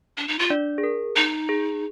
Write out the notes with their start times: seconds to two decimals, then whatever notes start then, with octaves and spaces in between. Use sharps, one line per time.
0.17 D4
0.28 D#4
0.39 F4
0.50 D4 D5
0.78 G#4
0.83 A#4
1.16 D#4
1.49 G#4